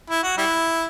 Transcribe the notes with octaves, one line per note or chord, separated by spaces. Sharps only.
E4
F#4
G3 E4